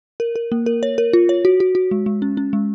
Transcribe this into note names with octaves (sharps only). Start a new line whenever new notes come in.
A#4
A#4
A#3
A#4
C#5
A#4
F4
C#5
F#4
F#4
F#4
G#3
G#3
C#4
C#4
G#3